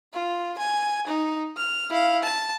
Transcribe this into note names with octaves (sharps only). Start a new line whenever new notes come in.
F4
G#5
D#4
F6
E4 F5
A5